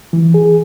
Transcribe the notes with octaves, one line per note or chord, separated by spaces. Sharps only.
E3
G#4